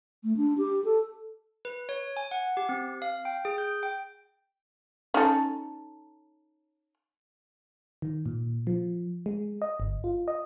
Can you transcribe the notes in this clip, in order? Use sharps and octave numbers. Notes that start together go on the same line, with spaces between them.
A3
D4
G4
A4
B4
C#5
G#5
F#5
G4
C4
F5
G5
G#4
G6
G5
C#4 D#4 A4
D#3
A#2
F3
G#3
D#5
G1
F4
D#5